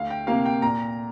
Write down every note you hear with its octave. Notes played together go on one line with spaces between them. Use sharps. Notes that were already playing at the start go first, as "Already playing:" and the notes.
Already playing: D2 F5
G5
C3 A#3 F5
G5
A#2 A#5